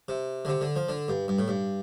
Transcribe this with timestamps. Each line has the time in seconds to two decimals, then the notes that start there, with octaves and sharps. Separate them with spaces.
0.08 C3
0.45 D3
0.48 C3
0.61 D3
0.76 F3
0.89 D3
1.08 G2
1.28 G2
1.39 A2
1.48 G2